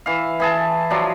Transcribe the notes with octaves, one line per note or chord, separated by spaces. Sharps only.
E3 F5
E3 G#4 A5
F3 F#3 D4